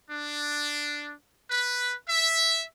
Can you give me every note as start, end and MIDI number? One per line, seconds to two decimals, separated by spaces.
0.11 1.12 62
1.50 1.94 71
2.09 2.64 76